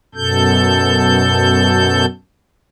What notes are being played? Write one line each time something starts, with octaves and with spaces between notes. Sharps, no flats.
F#2 B2 A4 G6